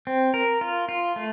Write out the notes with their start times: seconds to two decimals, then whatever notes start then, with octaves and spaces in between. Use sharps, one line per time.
0.07 C4
0.34 A#4
0.61 F4
0.89 F4
1.16 A3